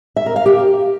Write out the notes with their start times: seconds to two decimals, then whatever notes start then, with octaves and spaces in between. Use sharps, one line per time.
0.16 E5
0.26 A#4
0.36 F5
0.46 G4